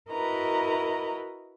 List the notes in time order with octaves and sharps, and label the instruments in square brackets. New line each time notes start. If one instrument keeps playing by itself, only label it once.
[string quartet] E4 F#4 A#4 B4 D#5 A#5